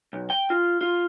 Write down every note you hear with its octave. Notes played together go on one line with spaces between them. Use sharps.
B1
G5
F4
F4